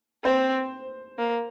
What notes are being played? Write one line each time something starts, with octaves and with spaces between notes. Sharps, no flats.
C4 C5
A#3